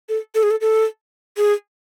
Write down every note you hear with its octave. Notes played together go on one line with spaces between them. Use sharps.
A4
A4
G#4
A4
A4
G#4